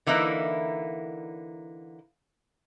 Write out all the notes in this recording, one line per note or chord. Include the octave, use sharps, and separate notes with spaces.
D3 E3 A#3 D#4 E4